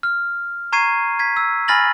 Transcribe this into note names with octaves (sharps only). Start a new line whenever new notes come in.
F6
A#5 C#6 G#6 C7 D#7
G#6 B6
E6
G#5 B5 F6 A6 A#6 F#7